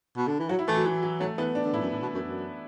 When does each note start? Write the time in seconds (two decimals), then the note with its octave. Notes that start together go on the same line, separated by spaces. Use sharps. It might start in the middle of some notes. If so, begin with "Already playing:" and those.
0.17 B2
0.27 D3
0.39 E3
0.49 F#3 F#4
0.59 E4
0.68 E3 A3
0.76 F#3
0.86 E3
1.03 F#3
1.20 F#3 A3
1.38 E3 B3
1.55 D4
1.65 D3
1.73 A2 E4
1.81 F#2
1.90 A2
2.02 B2
2.14 F#2
2.25 F#2